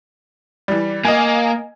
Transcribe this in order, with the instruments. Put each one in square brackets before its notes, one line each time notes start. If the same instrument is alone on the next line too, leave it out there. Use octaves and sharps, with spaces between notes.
[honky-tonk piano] E3 G3
[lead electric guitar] A#3 [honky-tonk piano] D#5 G#5